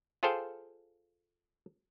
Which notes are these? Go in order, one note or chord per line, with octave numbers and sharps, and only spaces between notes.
F4 G#4 A4 C5 F5 G5